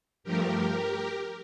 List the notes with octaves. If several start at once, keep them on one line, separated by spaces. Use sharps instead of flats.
G2 F3 A3 G4 A#4